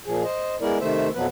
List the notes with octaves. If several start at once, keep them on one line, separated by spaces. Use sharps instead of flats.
A#2 F3 G#4
C5 D#5
G#3 B3 E4 A#4 D5
C3 D#3 A3 C5 E5
F2 B2 F3 F#3 B3 B4